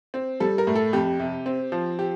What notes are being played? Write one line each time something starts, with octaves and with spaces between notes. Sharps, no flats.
C4
G3 A4
A#4
A2
A4
F2 G4
C3
C4
F3
G4